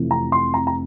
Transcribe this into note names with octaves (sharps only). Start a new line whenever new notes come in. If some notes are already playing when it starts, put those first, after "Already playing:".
Already playing: F1 F2 C3 E3
A#5
C6
A#5
A#5